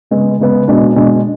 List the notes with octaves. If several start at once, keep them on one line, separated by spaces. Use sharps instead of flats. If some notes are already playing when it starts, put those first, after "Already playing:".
C#3 G#3 B3
C#3 G#3 B3
B2 G#3 D4
B2 G#3 D4